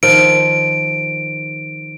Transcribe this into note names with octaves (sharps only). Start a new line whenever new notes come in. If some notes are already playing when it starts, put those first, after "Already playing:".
D#3 F3 D7